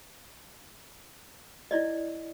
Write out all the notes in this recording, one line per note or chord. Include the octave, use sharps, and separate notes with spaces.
E4 D5 D#5